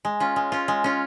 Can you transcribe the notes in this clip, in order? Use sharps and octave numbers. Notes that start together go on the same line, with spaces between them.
G#3
C#4 F4
G#3
C#4 F4
G#3
C#4 F4